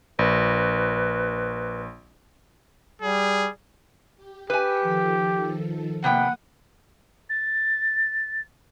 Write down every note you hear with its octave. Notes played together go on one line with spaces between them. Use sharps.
A#1 B4
G3 G#4
G4
G4 B4 G#5 E6 B6 C#7
D#3 F3 A4
C3 A#3 B3 F#5 G5 D#6
A6